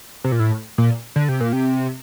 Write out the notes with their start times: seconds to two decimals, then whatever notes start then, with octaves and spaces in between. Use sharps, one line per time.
0.24 C3
0.32 A#2
0.40 A2
0.78 A#2
1.16 D3
1.29 C3
1.40 A#2
1.53 C3